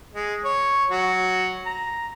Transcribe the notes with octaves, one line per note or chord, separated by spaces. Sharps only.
G#3
C#5
F#3
A#5